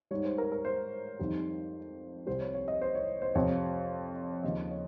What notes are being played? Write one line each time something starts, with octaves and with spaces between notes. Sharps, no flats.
G#2 G3 C#5
C5
A#4
A#4
C5
F2 D#3 G3
C2 C3 G3 C5
C#5
C#5
D#5
C5
C#5
C5
F2 C3 F3 C#5
D#2 C#3 F3 D#5
C#5